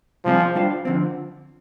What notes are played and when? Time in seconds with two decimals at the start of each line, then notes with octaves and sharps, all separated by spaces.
0.25 C3 F3 G3 C4 F4 G#4
0.55 G3 D4 F4 C5 F5
0.85 D3 F3 C4